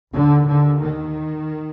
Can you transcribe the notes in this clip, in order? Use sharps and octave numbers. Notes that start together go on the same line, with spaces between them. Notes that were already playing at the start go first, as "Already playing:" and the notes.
D#2 D3
D3
D#3